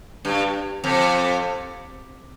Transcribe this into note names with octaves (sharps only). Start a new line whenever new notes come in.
G2
F2